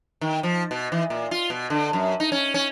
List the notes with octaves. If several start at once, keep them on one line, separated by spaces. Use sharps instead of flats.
D#3
F3
B2
E3
A#2
F4
B2
D3
F#2
D#4
C#4
C#4